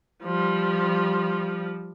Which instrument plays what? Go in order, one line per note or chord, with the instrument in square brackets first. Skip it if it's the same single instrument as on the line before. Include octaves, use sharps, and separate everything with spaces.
[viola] F3 G3